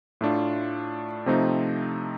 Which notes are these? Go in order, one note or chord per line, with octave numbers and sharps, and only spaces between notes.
A2 A3 D4 F4
C3 F3 A3 C4 D#4